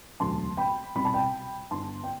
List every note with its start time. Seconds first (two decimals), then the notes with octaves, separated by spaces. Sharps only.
0.20 E1 D2 D3 F#3 A5 C6
0.57 G5 B5
0.95 C2 B2 G3 B5
1.05 A5
1.13 G5 B5
1.71 G1 G2 D3 A5 C6
2.04 G5